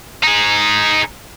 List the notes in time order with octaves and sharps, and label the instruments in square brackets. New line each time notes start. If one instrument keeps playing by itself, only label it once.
[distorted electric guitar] D#4 G#4